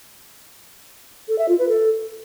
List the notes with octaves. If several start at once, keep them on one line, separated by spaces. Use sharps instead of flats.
A4
E5
F4
B4
A4